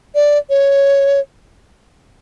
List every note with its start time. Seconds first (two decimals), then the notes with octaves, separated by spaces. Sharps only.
0.15 D5
0.50 C#5